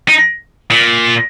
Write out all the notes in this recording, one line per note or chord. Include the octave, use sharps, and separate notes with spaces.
D#4
A#2